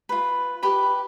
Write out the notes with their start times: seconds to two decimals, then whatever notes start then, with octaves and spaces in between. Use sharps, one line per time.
0.09 F4 B4
0.63 G4 B4 B5